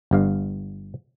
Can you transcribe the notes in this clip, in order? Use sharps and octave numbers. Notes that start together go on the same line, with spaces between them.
G1 G2 F5